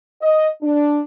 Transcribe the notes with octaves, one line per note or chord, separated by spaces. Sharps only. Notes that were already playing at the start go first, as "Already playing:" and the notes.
D#5
D4